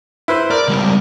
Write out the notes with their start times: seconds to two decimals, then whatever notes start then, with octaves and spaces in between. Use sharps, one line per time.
0.28 E4 B4 C5
0.51 A#4 D5
0.68 C#2 G3